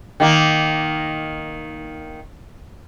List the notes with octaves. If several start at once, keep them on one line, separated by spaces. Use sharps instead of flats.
D#3 A#3